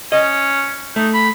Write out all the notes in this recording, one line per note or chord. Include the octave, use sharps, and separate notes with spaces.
C#4 D#5
A3 D#4
B5